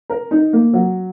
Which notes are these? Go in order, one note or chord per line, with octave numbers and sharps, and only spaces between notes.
A#4
D#4
A#3
F#3